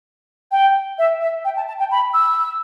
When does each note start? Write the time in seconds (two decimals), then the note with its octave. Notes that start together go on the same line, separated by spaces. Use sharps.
0.51 G5
0.98 E5
1.21 E5
1.45 G5
1.57 A5
1.68 A5
1.79 G5
1.91 B5
2.14 E6